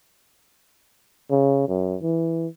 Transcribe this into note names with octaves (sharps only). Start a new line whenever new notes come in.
C#3
F#2
E3